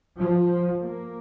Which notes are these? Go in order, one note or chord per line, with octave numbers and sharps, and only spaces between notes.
F3
A#3